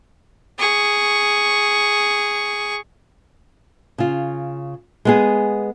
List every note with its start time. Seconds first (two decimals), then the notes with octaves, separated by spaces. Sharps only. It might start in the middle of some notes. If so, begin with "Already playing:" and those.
0.59 G#4 C#6
3.98 C#3 F4
5.05 G#3 B3 G#4